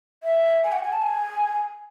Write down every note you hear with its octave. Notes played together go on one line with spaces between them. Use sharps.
E5
G#5
F#5
G#5
A5
G#5